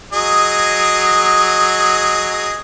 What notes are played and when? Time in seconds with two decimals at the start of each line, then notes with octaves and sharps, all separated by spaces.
0.13 F#3 G#4 D#5